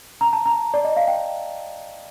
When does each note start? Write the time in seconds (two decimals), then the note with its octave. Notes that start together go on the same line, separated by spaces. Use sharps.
0.21 A#5
0.33 A5
0.46 A#5
0.74 D5
0.84 D#5
0.96 F5
1.08 G5